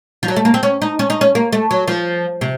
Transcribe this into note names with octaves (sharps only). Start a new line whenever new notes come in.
F3
F#3
A3
A#3
C4
C#4
D#4
C#4
D#4
C#4
A#3
A3
F#3
F3
C3